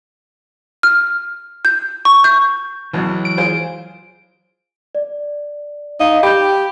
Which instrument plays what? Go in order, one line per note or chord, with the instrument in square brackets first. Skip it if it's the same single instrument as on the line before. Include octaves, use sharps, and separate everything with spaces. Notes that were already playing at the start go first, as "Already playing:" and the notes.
[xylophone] F6
G6
C#6
G6
[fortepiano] C#2 B2 [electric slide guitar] E3 F#3
[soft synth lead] D7
[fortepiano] F4 G#4 C5
[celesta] D5
[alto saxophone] D#4 [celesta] F5
[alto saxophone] G4 [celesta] B5 G6